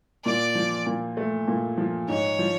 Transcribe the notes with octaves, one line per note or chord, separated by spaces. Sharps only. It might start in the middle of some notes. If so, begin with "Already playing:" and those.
A#2 D5
F3
A#2
A3
A#2
F3
G#2 C#5
F3